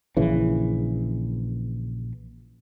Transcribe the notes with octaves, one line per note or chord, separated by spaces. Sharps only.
A#1 C#3 E3